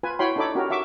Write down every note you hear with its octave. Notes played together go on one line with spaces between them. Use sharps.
F4 B4 G#5
E4 F#4 C#5 G5 B5 C6
D4 D#4 A4 C#5 B5 D6
C#4 F#4 G4 A#4
F#4 E5 C#6 D6